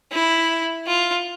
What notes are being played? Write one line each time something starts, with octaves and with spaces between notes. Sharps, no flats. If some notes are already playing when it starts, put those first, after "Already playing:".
E4
F4